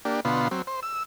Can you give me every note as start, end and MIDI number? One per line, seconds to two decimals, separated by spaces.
0.05 0.20 58
0.05 0.20 62
0.05 0.20 67
0.25 0.48 47
0.25 0.48 50
0.25 0.48 59
0.25 0.48 65
0.25 0.48 84
0.51 0.62 54
0.51 0.62 60
0.67 0.80 72
0.83 1.03 88